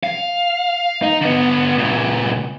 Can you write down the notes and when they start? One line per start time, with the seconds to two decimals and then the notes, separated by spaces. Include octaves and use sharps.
0.03 F5
1.02 D#4
1.21 D3 B3
1.78 C#2 A#2